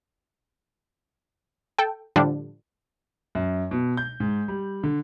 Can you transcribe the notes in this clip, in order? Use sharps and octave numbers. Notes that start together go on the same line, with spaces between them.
A4 G5
A2 D3 F3 G3 D4
F#2
B2
G6
G#2
G3
D3